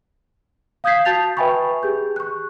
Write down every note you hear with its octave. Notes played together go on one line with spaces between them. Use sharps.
F5 D#6 G6 G#6 B6 C7
F#4 A5 G6 A6 F7
B4 E5 G5 G#5 B5 C#6
G4 G#4 G6
C#6 F#6